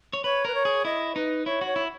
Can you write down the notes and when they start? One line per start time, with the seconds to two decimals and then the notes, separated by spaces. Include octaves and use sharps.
0.13 C#5
0.24 B4 C#5
0.45 A#4 B4
0.55 C#5
0.65 G#4
0.85 E4 D#5
1.15 D#4 B4
1.46 E4 C#5
1.61 F#4
1.67 C#5
1.76 E4